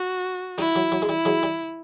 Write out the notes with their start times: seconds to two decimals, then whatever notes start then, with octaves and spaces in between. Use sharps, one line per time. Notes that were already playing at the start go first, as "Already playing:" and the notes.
Already playing: F#4
0.58 G3 E4
0.76 F#3
0.92 F#3
1.02 G#3
1.09 G3 E4
1.25 F#3 G#3
1.43 G3